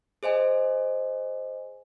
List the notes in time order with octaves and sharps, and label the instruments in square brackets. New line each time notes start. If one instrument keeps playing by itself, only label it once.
[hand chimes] G#4 C5 D#5 G#5